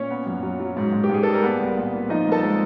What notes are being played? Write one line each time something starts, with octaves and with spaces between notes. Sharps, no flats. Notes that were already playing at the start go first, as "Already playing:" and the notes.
Already playing: A#2 C#4 C#5
B3
F#2
F#3
F#3
G#2
G#2
G4
G#2 G#4
G3 A4
A#4
A#3 B3 B4
C2
A#2
A#2
F3 D#4 D#5
C2
A4 A5
G#3